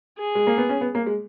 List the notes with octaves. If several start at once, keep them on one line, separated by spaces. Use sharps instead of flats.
G#4
G#3
A#3
B3
C#4
B3
A#3
G#3